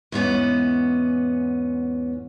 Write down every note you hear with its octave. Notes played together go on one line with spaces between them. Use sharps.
E2 G#2 B3 C#4